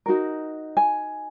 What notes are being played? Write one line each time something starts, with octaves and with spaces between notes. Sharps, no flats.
D#4 F#4 A#4
G#5